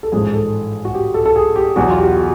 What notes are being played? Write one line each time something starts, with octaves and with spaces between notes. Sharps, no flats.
A4
A1 G#2 F3 G#4
A4
F#4
G4
A4
A4
G#4
G4
E2 B2 F#3 F#4
F4
G4
F#4
F#4